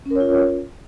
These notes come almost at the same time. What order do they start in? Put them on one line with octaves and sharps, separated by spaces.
C#4 A#4 C#5 F4